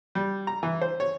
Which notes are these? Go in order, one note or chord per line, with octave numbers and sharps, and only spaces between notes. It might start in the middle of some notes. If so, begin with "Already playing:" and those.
G3
A#5
E3
C5
C#5